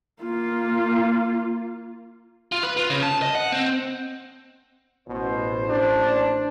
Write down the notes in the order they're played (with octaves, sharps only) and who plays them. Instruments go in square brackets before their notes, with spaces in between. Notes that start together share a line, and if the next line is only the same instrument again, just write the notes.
[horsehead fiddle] A#3 F4
[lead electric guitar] F4
B4
F4
C#3
A5
D#5
F#5
C4
[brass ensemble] A1 C5 [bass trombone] B2
[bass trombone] D4